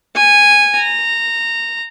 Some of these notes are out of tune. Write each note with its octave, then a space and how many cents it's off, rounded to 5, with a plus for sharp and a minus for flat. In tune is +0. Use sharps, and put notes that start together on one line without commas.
G#5 -10
A#5 -15